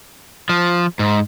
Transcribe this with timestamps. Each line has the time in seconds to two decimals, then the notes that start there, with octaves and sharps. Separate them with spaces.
0.49 F3
0.99 G#2